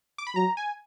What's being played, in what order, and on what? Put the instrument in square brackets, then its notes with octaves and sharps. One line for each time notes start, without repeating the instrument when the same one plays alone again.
[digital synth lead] D6
B5
[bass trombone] F#3 [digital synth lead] A#5
[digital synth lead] G#5